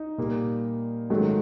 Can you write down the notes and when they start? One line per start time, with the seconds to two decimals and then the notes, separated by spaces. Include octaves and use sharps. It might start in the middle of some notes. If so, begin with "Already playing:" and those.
Already playing: D#4
0.18 A#2 G3 A#3
1.10 G#2 D#3 F#3 A3